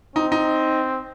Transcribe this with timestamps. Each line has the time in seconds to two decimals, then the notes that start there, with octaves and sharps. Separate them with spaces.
0.16 C4 D#4
0.32 D#4